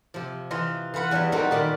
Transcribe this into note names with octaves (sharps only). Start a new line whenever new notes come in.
C3 F3
E3 F4 D#5 A#5
E3 F4 B4 F#5
E2 G3 C#5 D#5 E5
G3 A#3 C4 D#4 F#4 A4
A#2 D#3 D5 B5